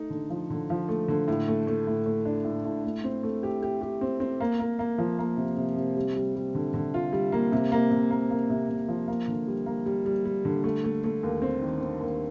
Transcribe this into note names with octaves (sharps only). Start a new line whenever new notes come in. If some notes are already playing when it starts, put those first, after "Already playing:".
Already playing: A3 D#4
D3
F3
D3
F3
A3
D3
A2
A3
A3
A2
A3
D4
A2
A2
A3
C4
A3
G4
G4
G4
C4
C4
A#3
A#3
A#3
F3
A#3
C3
C3
C3
G3
G3
G3
D3
D3
F4
G3
A#3
C3
A#3
C3
A#3
A#3
C3
C3
F3
A#3
D3
G3
A#3
G3
G3
G3
D3
A3
A3
A3
D#2
C4
D#3
C4
D#2